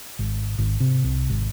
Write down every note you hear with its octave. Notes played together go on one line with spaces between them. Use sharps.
G#1
G#1
C3
C2
G#1